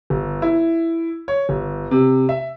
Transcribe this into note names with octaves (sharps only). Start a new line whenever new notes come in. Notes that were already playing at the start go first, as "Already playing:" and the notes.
G1
E4
C#5
G1
C3
E5